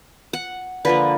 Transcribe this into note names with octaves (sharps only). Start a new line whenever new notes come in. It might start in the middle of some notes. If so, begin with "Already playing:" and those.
F#5
D3 F3 A#3 B4